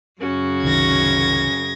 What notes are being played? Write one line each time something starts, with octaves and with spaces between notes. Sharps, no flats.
F#2 C#3 C#4 F#4
C2 D#3 G#6 A#6